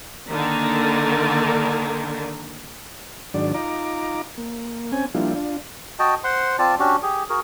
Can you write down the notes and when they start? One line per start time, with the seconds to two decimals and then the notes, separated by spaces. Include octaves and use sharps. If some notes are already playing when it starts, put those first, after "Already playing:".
0.28 D3 D#3 A#3
3.34 G#2 D#3 F#3 D4 D5
3.54 D#4 F4 A#5 D6
4.38 A#3
4.92 C4 C#4 G#5
5.15 F3 G3 A#3 D4 E4 F4
5.35 D4 F4
5.99 F#4 D#5 G5 A5
6.24 C5 F#5 C6
6.59 C4 F4 D5 A5
6.79 C#4 D4 F#4 G4
7.03 G4 G#4
7.30 F#4 G#4 A#4